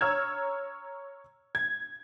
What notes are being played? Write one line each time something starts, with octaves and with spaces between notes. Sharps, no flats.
C#5 A#5 E6 F6 G#6
G#6